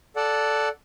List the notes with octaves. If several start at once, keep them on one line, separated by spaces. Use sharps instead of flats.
A4 D5 F#5